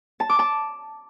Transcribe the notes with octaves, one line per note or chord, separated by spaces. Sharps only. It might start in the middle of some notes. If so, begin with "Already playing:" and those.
A5
D6
A5